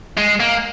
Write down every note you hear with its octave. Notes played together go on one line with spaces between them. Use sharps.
G#3
A#3